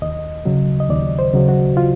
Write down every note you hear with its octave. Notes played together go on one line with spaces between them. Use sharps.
D#2 D#5
C#3 F#3
D#5
D#2 D5
C5
C#3 F#3
F#4
F4